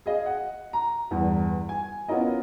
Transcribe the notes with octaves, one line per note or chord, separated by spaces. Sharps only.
G#4 D#5 F5
F#5
A#5
E2 G2
G#5
B3 C#4 E4 F4 A#4 D#5